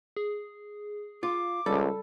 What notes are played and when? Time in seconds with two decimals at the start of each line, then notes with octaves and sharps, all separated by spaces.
0.17 G#4
1.23 F4 D6
1.66 C#2 G3 A4